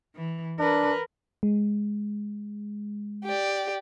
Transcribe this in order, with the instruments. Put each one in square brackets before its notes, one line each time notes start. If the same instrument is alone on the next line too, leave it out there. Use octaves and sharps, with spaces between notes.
[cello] E3
[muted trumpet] D4 [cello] A#4 B4
[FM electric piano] G#3
[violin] G4 D5